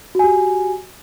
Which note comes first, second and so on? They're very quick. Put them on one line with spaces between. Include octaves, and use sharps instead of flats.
F#4 G#5 G4